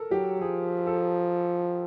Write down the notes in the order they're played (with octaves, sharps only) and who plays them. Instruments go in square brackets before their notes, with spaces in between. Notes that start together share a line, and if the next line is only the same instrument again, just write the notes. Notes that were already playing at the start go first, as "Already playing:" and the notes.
Already playing: [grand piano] A4 A#4
[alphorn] F#3 [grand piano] G4
[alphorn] F3 [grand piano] G#4
[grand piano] A4